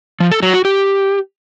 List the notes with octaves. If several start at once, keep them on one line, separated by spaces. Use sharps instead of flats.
F3
A4
F#3
F#4
G4